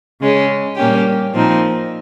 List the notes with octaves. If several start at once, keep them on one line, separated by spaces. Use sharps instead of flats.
C#3 G#3 C#4
A#2 G3 A#3 C#4 G4
A#2 F3 C4 D#4